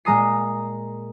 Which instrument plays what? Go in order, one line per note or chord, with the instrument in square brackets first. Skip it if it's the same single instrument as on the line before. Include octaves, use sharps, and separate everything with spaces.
[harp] A#2 G#3 A#5 D#6 C7